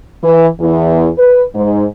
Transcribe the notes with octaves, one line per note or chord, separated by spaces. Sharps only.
E3
E2
B4
G#2